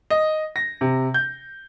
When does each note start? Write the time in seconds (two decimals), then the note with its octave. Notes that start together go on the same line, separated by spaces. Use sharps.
0.10 D#5
0.56 A#6
0.81 C3
1.14 G6